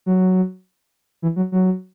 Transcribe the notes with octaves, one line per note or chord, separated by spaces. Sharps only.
F#3
E3
F#3
F#3